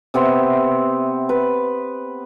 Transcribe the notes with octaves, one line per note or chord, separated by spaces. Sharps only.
C3 B3 C5 E5
B4